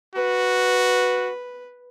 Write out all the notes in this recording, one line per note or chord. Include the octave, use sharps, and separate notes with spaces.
F#4 B4